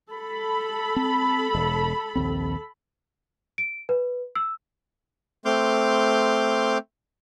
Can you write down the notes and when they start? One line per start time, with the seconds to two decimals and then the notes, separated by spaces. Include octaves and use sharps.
0.12 A4 B5
0.96 C4
1.55 E1
2.15 A#1 D#2 C4
3.58 D7
3.89 B4
4.35 E6
5.45 A3 C4 C6 D6 F6 G6